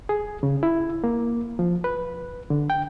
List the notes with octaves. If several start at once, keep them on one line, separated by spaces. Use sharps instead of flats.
G#4
C#3
E4
A#3
F3
B4
D3
G5